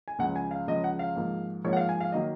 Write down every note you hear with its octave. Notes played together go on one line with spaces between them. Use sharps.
G#5
C#2 C#3 F3 F#5
G#5
F5
C#2 C#3 F3 D#5
F#5
F5
G#2 F3 A#3
G#2 F3 A#3 C#5
F#5
F5
G#5
F5
D#3 F#3 A#3 D#5